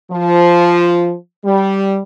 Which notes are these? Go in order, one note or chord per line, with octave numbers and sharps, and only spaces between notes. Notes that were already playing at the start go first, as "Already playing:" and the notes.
F3
G3